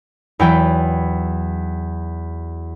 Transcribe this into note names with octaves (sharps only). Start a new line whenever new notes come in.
E2 F#3 E4 B4 G5